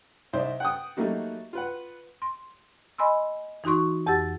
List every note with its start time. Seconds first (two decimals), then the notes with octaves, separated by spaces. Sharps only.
0.33 C2 D#4 C5 D5 E5
0.60 F#5 G5 D#6
0.97 F#3 G3 A3 A#3 D#4 F#4
1.53 F4 B4 F#5
2.22 C6
2.98 D#5 G#5 B5 C6 E6
3.64 E3 D#4 F#4 C6 C#6
4.07 F2 G4 F#5 E6 A6